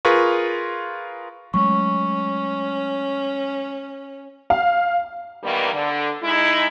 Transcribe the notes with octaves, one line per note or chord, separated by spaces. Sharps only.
F4 G#4 A#4 B4 C#6
F#3 G#3 A3 C#4 C#6
F5
A#2 D#3 E3 G3 A#3 B3
D3
G#3 D#4 E4